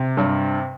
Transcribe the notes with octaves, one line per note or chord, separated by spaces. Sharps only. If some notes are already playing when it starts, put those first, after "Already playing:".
Already playing: C3
G2